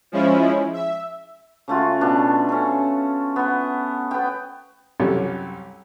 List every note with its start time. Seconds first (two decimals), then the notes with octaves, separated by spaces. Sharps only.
0.12 F3 G#3 C#4 E4
0.73 E5
1.68 C#3 A3 F4 F#4
2.01 B2 D4
2.49 C#4 A4
3.36 B3 F#5
4.11 B3 G5
5.00 C2 F#2 C#4 G4 A4 C#6